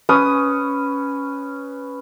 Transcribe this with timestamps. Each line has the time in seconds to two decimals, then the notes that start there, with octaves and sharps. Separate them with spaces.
0.09 C#4 B4 D#6